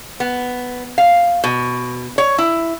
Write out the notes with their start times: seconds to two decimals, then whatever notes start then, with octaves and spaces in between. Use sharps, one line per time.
0.20 B3
0.98 F5
1.44 B2
2.18 C#5
2.38 E4